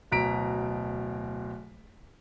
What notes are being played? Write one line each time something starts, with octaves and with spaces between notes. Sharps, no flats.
D1 B2 A#5 B6 D7